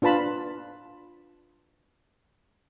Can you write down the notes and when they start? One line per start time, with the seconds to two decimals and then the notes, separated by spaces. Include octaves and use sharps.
0.02 D4 F4 B4 A5 B5